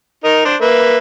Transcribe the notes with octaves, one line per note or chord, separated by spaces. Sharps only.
D#4 A#4 D#5
D4 C5
A#3 B4 E5